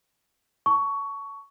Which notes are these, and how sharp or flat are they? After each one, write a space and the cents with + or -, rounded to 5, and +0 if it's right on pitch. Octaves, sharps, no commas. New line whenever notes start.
A5 +15 C#6 +15